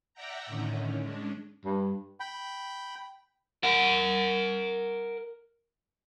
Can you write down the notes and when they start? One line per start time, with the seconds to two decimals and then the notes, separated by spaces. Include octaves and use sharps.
0.14 D5 E5 F#5 G5 A#5
0.46 A2 D3 D#3 C#4
1.01 G#3 C#4 D4
1.65 G2
2.20 G5 B5
3.63 A#4 F#5